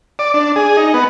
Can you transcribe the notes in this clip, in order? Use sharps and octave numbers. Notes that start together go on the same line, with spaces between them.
D5
D4
G#4
D#4
B3